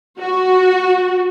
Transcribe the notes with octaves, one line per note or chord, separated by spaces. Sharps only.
F#4